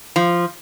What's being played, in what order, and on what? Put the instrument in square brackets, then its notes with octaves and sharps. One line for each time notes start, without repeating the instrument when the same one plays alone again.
[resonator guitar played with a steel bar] F3